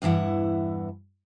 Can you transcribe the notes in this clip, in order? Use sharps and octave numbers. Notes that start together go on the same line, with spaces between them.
E2 G2 E3 E4 F#5